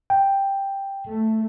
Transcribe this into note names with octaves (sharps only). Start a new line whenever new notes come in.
G5
A3